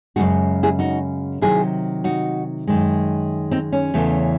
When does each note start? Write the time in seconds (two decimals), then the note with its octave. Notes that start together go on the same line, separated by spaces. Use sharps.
0.16 F#2 C#3 G#3 D#4 F#4
0.63 E4 G#4
0.79 D#4 F#4
1.41 C3 D#3 F#3 E4 G#4
2.04 D#4 F#4
2.67 F#2 D#3 G#3
3.51 C4 D#4
3.72 C#4
3.94 E2 C#3 E3 A3